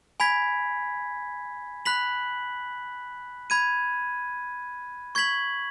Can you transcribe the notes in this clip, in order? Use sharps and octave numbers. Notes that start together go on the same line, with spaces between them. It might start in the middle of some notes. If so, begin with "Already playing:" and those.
G#5 B5 G#6 B6
B5 F#6 B6 F#7
B5 G#6 D#7
C#6 G#6 B6 F#7